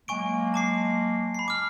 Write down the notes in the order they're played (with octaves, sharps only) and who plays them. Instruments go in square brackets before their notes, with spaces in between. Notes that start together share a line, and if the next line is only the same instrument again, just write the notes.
[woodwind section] F#3 G#3 A#3 [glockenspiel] G#5 C#6 D7
[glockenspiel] A5 D6 C7
B5 C7
D6 F6